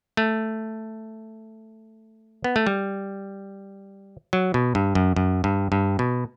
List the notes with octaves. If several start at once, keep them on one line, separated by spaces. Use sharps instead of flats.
A3
B3
A3
G3
F#3
B2
G2
F#2
F#2
G2
G2
B2